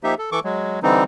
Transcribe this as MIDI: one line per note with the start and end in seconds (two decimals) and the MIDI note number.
0.04 0.15 53
0.04 0.15 58
0.04 0.15 63
0.04 0.15 67
0.04 0.15 76
0.19 0.30 69
0.32 0.40 52
0.32 0.40 69
0.32 0.40 85
0.32 0.40 86
0.44 0.79 54
0.44 0.79 56
0.83 1.04 50
0.83 1.04 52
0.83 1.04 55
0.83 1.04 60
0.83 1.04 63